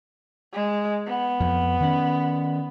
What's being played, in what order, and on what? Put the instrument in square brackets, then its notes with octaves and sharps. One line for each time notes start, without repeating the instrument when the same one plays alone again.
[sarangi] G#3
B3
[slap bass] F2 F3
D#3 C#4